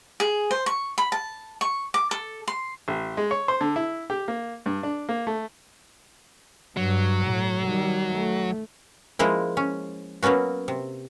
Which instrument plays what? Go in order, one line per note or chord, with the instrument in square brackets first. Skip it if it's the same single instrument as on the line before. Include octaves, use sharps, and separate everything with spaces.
[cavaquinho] G#4
C5
C#6
B5
A5
C#6
D6
A4
C6
[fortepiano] A1
G#3
C#5
C5
D3
E4
G4
A#3
G2
D4
A#3
A3
[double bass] G2 [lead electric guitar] F#3
[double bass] A2
D#3 G3
A3
[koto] F3 G#3 A#3 E4
C#4
F#3 A#3 B3 C#4 F#4
C3